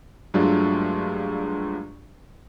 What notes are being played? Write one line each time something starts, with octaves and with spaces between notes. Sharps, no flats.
G2 F#3 G#3 A3 D4 F4